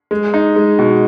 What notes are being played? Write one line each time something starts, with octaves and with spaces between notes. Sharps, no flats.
G#3
D#4
G#3
B2